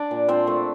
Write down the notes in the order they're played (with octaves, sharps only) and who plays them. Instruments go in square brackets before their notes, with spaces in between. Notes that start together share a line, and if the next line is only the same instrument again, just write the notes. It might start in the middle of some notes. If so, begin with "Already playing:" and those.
Already playing: [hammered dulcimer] D4 D5
A#2
A#2 C4 C5
A3